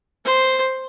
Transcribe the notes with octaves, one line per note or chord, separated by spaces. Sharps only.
C5